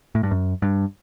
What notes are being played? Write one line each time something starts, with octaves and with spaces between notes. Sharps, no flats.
A2
G2
F#2
G2